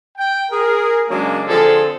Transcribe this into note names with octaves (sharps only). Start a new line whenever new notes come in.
G5
G#4 A#4
C#3 F#3 G#3 A#3 C#4 D4
D3 F3 C4 F4 G#4 A4